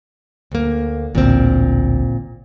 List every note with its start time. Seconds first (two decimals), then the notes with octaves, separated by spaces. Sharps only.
0.52 D2 A#3
1.15 A1 D2 A#2 C4